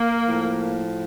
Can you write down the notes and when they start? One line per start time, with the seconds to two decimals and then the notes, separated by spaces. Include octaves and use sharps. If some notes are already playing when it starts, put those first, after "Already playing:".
Already playing: A#3
0.26 A2 F3